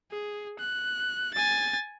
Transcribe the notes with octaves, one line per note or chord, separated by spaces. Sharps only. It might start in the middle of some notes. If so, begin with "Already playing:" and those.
G#4
F#6
G#5 A6